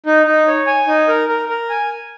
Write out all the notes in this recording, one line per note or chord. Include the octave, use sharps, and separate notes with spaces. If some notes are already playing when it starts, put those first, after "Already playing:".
D#4
D#4
C#5
G#5
D#4
A#4
A#4
A#4
G#5